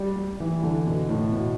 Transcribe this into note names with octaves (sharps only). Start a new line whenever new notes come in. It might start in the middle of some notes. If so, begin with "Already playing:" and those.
Already playing: G3
G3
E3
D3
B2
A2
B2